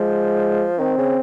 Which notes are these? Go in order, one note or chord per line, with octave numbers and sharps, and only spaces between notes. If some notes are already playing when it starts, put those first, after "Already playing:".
Already playing: F3 G#3
D#3 C4
C#3